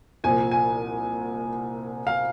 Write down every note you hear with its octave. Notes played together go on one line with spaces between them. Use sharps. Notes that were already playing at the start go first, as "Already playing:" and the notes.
C2 A#2 F3 G#5
G#5
F5